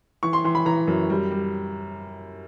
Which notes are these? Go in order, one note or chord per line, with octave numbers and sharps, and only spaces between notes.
E3 C#6
C6
E3 C6
B5
E3 A#5
F#2
G3
G3